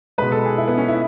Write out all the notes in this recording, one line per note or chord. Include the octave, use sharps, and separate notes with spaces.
B2 G#3 B4
A4
G#4
E4
B3
C#4
E4